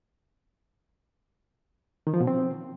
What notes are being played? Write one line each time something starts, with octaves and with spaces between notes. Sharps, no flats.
D#3
F3
B2
C4